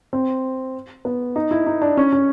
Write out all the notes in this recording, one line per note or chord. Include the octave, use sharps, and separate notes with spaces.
C4
B3
D#4
E4
D#4
D4
C#4
C#4